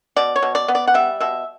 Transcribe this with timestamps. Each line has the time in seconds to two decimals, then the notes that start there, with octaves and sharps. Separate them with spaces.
0.16 B2 D5
0.36 C#5
0.42 B2
0.55 D5
0.68 B3
0.75 D5
0.87 F#5
0.94 G3 E5
1.20 B2 E5